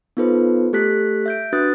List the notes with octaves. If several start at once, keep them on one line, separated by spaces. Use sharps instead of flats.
B3 D#4 F4 A4 B4 C5
A3 G4 A4 F#6 B6
E5 G6 D7
D4 F#4 B4 D#6 F#6 A6